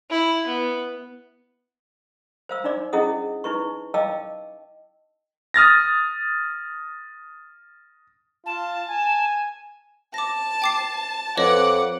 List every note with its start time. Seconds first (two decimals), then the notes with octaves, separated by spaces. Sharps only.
0.10 E4
0.47 B3
2.49 C5 F5 E6
2.64 D4 D#4 D5 D6
2.93 C#4 E4 G#4 D#5 F#5 D#6
3.44 D#4 E4 B4 C#6
3.94 D#5 F5 G5 A5 D6 E6
5.54 D#6 F6 A6 A#6
8.46 F4 A5
8.89 G#5
10.14 A5 D6 A#6
10.62 G5 D6 C7
11.37 F2 B4 C#5 D#5 F#5 D6